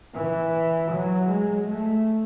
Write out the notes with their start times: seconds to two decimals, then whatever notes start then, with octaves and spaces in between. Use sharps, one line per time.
0.15 E3
0.91 F#3
1.29 G#3
1.68 A3